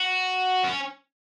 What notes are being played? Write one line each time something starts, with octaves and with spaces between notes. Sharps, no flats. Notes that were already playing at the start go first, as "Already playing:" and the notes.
Already playing: F#4
C#4